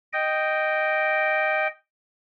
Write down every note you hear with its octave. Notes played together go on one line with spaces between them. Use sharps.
D#5 G5